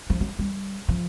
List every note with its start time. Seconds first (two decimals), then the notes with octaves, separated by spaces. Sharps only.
0.10 F3
0.20 F#3
0.39 G3
0.89 F3